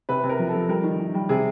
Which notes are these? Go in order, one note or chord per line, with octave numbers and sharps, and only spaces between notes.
C3 B4
C3
A#4
F3
A4
F3
G3 A#4
D#3
D#3
G3
C3 G#4